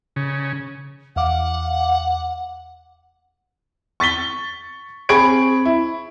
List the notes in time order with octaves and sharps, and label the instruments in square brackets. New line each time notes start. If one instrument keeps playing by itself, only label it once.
[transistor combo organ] C#3
[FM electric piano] E2 F5 D6 [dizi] F#5
[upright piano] C#6 A6 B6 G7
C4 G#4 B5 C#6 G#6 D7
E4